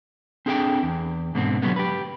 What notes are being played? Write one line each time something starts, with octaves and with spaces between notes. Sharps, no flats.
C4 D4 G#4 A4 F#5 G5
E2
G#2 B2 D3 C4
D3 F#3 G3 A#3 B3
G4 B4